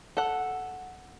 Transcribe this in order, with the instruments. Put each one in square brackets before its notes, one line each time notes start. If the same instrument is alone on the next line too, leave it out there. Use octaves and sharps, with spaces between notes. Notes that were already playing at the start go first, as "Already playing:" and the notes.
[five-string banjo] A4 F#5